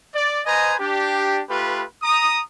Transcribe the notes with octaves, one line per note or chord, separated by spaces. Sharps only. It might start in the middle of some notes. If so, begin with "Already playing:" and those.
D5
B4 C5 D#5 G#5 A#5
D4 G4
A3 F4 G4 B4
A#5 D#6